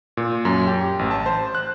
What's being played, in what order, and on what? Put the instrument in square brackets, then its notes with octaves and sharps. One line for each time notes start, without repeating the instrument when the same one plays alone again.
[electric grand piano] A#2
F#2
G4
A1
A5
C5
F#6